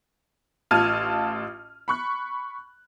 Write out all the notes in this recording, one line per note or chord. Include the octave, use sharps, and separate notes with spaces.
A1 F4 A5 F6 G#6 D#7
B5 C#6 F#6